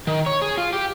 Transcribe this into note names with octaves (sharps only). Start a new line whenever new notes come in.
D#3
C#5
G#4
F4
G4